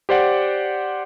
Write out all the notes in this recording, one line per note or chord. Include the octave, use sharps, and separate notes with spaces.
G4 C5 D5 F#5